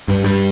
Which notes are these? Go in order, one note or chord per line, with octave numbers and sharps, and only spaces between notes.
G2
G2